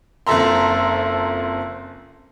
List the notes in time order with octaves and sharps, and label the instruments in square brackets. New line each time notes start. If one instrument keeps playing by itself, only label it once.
[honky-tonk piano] F#1 F2 A4 E5 A#5 C6